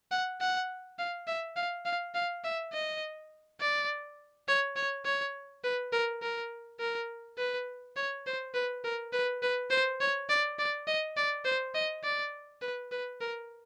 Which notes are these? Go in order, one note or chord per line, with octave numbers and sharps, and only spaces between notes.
F#5
F#5
F5
E5
F5
F5
F5
E5
D#5
D5
C#5
C#5
C#5
B4
A#4
A#4
A#4
B4
C#5
C5
B4
A#4
B4
B4
C5
C#5
D5
D5
D#5
D5
C5
D#5
D5
B4
B4
A#4